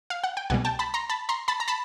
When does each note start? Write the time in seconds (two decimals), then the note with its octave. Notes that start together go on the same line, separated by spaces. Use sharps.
0.10 F5
0.24 F#5
0.37 G5
0.50 C2 B2 G3 F#5 G#5
0.65 G5 A5
0.79 A5 B5
0.94 A#5 C6
1.10 A5 B5
1.29 A#5 C6
1.48 A5 B5
1.60 A#5
1.68 A5 B5